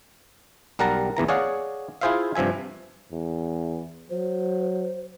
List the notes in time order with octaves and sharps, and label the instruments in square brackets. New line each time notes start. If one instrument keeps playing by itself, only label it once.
[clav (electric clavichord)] B1 G3 A#4 F#5 A5 A#5
A#1 E2 E3 A#5
G#4 C#5 D5 F5 F#5
E4 F4 G#4 C5 E5 F5
G2 C3 F3 E5 G#5
[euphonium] E2
[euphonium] F#3 [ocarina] C5